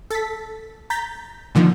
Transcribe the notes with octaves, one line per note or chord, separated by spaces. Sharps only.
A4 A6 B6
A#5 G6 A6 B6
A#2 D3 D#3 F3